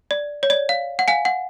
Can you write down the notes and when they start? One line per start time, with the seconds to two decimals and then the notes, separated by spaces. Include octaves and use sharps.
0.11 D5
0.43 C#5
0.50 D5
0.69 F5
0.99 F#5
1.08 F5 G#5
1.25 F#5